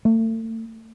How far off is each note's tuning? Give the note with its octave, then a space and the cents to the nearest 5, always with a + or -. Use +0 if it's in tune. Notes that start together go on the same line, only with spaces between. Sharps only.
A3 +35